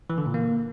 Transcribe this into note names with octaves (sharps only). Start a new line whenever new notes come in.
E3
D3
A#2
A#3